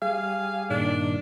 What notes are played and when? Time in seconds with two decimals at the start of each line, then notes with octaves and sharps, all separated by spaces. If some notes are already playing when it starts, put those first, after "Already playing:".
0.02 G3 G#4 F5
0.70 G2 A#2 D#3 D4